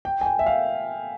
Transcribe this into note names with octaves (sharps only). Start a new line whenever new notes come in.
G5
G#5
G5
E5
F5